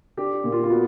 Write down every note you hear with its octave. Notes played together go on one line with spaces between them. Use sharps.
D4 G4
A#2
F4
F4
B3 F#4